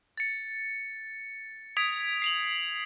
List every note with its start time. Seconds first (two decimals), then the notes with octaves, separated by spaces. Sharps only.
0.18 A6 C#7
1.77 D#6 G#6 B6 D7 F7
2.22 C7 F7 F#7